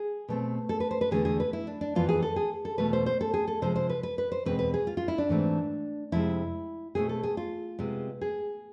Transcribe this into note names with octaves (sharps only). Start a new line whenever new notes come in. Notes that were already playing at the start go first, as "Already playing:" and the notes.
Already playing: G#4
B2 A3 C4
A4
B4
C5
B4
E2 D3 A3 G#4
G#4
B4
E4
D4
D4
F2 E3 B3 F4
G#4
A4
G#4
A4
E2 B2 A3 B4
C5
C5
A4
G#4
A4
C3 F3 G#3 C5
C5
B4
B4
B4
C5
E2 B2 G#3 C4 B4
B4
G#4
F4
F4
E4
D4
G#2 E3 A3 C4
F2 C3 G#3 E4
B2 A3 C4 G#4
A4
G#4
F4
C3 G#3 B3
G#4